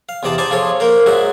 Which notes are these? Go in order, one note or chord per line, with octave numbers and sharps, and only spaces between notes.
F5
E2 C3 D#4 D5 A5
D#4 C5 D5 G#5 A5
F3 F4 G#4 A4 C#5
A#3 A#4 C5
G#2 F#3 F#4 G#4 E5